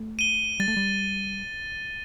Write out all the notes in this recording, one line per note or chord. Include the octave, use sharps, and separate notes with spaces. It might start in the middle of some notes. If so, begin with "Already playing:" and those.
Already playing: A3
D#7 G7
G3 A6
A3
G3